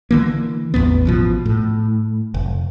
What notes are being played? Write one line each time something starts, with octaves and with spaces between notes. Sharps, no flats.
D3 E3 A#3
A1 E2 G#2 B3
A1 B2 F3
A2
F1